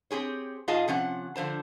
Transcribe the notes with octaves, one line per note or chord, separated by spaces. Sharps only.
C4 G4 G#4 C#5
G#2 F4 G#4 D#5 F5 A5
C3 F3 C#4 F#5
D3 F3 C5 A5